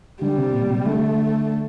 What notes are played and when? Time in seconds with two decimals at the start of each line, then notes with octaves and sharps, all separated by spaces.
0.21 D3 G3
0.38 C3
0.54 A#2
0.69 C3
0.85 D3 A3